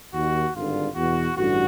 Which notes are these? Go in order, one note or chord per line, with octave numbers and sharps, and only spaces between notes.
D#2 D#3 F#4
G#1 G2 D3 F4
E2 B2 F#4
A1 G2 D3 F#4